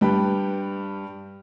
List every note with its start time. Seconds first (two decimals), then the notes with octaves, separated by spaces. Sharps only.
0.01 G2 G3 B4 G5 B5